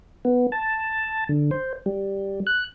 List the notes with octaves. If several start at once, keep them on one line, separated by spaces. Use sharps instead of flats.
B3
A5
D3
C5
G3
F#6